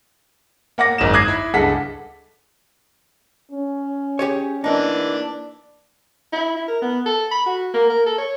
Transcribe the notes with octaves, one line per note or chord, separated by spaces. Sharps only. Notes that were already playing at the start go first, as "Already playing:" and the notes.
A#3 F#5 D6 A#6
G#1 F#2 D#4 E7
D6 D#6 F#6 G#6 A#6 C7
E4
C#2 G2 G#4 A4 F#5 B6
C#4
G4 G#4 C#5
E3 A#3 D4 D#4
E4
E4
A#4
B3
A4
B5
F#4
A#3
A#4
A4
C#5